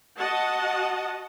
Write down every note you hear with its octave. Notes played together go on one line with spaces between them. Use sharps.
F#4 D#5 F#5 A5